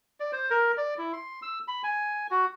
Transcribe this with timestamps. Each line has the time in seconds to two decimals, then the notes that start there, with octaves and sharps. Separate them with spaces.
0.20 D5
0.32 C5
0.50 A#4
0.77 D5
0.98 E4
1.13 C6
1.42 E6
1.68 B5
1.84 G#5
2.31 F#4